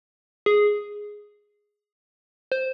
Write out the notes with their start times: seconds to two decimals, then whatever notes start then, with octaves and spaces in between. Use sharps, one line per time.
0.46 G#4
2.52 C5